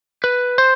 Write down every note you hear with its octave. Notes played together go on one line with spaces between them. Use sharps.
B4
C5